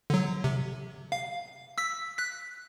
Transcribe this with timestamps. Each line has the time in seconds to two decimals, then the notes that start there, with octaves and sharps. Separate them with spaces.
0.10 D3 F#3
0.44 C3
1.12 F5
1.78 E6 B6
2.18 F#6 B6